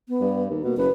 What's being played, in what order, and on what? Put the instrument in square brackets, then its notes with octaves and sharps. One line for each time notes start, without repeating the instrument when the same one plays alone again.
[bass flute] B3
[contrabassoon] G2
D#2
[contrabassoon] B2 [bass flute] A#3
[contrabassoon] F#1 [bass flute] B4